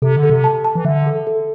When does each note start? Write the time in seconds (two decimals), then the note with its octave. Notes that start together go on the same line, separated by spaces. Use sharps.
0.02 C3 A4
0.16 D3
0.23 A4
0.30 C3
0.44 A5
0.65 A5
0.75 E3
0.85 D3 E5
1.07 A4
1.27 A4